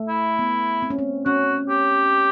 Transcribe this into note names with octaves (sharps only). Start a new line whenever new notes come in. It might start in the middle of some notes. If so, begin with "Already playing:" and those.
Already playing: A3
E4
B3
C4
C#4
C4
C#4 F#4
G4